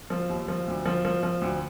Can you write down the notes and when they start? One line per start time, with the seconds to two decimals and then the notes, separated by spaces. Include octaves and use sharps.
0.10 F3
0.29 D#2
0.48 F3
0.68 D2
0.86 F3
1.05 F3
1.23 F3
1.41 D2